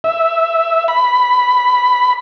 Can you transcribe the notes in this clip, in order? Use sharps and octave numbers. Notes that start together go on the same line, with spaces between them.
E5
B5